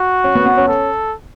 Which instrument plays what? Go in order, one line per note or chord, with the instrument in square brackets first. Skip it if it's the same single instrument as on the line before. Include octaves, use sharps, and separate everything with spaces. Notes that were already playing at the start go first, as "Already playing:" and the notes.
Already playing: [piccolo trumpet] F#4
[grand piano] C#4
B3
B3
C#4
[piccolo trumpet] A4